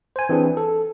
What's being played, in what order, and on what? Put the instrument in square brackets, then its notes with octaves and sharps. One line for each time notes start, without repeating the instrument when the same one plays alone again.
[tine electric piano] C5 G#5
E3 C4 D4 G#4 B4
A4